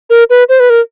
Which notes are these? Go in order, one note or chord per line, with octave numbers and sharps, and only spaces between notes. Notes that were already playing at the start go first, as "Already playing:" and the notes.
A#4
B4
C5
B4
A#4